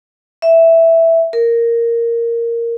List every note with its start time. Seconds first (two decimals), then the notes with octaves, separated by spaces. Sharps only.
0.42 E5
1.33 A#4